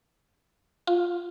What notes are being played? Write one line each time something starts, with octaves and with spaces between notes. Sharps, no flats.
F4